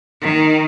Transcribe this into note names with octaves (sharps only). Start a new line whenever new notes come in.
D#3